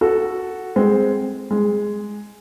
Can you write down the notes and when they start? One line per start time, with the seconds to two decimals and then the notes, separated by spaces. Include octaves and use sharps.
0.01 F#4 A4
0.76 G#3 C4
1.51 G#3